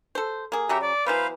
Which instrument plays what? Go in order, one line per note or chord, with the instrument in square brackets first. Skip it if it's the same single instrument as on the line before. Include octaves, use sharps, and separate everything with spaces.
[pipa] A4 C5
A#3 G#4
[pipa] C#3 F#3 C#4 [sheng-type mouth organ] G4 E5 A#5
[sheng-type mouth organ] D5
[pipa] E3 F#3 B3 [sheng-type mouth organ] B4 C5 F5